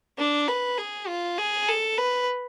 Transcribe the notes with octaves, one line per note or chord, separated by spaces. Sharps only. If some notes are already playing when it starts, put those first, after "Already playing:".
D4
B4
G#4
F4
G#4
A4
B4